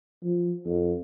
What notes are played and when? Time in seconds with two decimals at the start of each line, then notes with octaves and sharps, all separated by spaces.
0.23 F3
0.65 F2